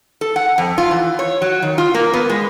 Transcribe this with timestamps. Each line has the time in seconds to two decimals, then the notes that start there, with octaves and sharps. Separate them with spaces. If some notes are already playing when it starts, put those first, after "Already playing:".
0.21 A4
0.36 F#5
0.58 F2
0.78 F4
0.91 E3
1.19 C#5
1.42 F#3
1.62 D#3
1.78 F4
1.94 A#3
2.13 B3
2.30 G#3